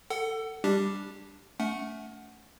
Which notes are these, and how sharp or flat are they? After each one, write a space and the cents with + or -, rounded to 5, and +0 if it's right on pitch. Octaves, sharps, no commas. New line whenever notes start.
A4 +20 F#5 +25
G3 +5 D4 +0 G4 +0
A3 +0 C#4 +35 F#5 +0